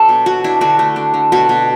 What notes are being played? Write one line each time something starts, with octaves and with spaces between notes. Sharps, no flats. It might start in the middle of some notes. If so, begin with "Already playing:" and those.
Already playing: F#3 D4 A4
B2
B2 F#4
D4 E4
D3 F#4
A3
D4
D3
B2 F#4
B2